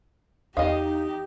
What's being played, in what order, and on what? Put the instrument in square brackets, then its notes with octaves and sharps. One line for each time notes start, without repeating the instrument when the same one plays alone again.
[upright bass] E2 [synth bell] D#4 [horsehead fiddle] G4 [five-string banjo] D#5 F5